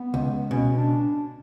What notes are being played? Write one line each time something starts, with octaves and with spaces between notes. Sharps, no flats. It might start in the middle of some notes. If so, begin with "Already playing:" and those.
Already playing: B3
C#2
B2 C#4
D4